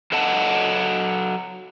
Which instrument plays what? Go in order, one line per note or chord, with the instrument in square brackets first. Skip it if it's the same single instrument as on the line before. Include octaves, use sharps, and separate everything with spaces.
[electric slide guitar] F#3 A4 D#5 F#5 A5